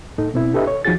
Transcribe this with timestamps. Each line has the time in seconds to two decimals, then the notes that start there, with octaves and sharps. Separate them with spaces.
0.18 A2 D#4 A4
0.34 B2 C4 E4
0.53 D4 G4 A4 B4 D#5 E5
0.67 C#5
0.85 D#2 F3 D#4 F#4 G#4 A6